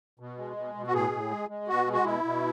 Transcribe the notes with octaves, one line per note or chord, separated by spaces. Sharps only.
B2
G#3
B2
B2
F#4
A2 G#4
A2
G#3
G#3
B2 F#4
G#3
F#4
B2 E4
B2